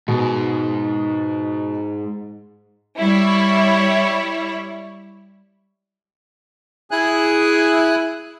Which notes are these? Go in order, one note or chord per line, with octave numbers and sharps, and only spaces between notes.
G#2 B2
G3 E4 C#5
E4 G#4 G#5 F#6